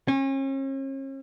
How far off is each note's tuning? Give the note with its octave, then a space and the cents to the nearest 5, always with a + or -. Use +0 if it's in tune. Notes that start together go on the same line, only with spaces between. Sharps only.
C#4 -40